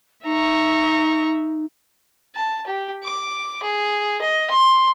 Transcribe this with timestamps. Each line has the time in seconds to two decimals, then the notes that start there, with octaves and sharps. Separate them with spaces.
0.25 D#4 E5 A#5 C#6
2.35 A5
2.66 G4
3.03 D6
3.63 G#4
4.21 D#5
4.50 C6